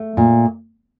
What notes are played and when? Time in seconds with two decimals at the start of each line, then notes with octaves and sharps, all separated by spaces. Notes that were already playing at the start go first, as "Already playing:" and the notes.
Already playing: A3
0.17 A#2